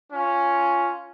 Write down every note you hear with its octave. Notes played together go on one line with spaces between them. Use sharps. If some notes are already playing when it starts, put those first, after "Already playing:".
C#4 F4